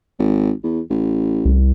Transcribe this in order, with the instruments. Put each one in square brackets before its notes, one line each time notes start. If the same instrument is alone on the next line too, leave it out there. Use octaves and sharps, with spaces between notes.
[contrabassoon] G#1
E2
A1
[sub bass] C2